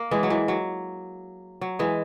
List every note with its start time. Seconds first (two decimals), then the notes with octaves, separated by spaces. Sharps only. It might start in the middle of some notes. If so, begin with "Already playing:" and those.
Already playing: A#3
0.11 E3 G#3
0.23 F#3
0.30 E3
0.48 F#3
1.61 F#3
1.79 E3 G#3